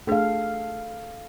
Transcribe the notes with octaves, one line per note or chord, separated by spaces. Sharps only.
A3 D4 G#4 A4 F5